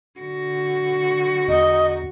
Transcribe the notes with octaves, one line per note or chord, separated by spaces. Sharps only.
D3 F#4
E2 D#5